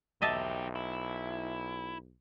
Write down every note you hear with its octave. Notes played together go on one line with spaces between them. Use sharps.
B1 D#4 G4 D#5 E5 A5
E4